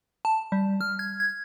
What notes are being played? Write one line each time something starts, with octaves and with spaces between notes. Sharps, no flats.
A5
G3
F6
G#6
G#6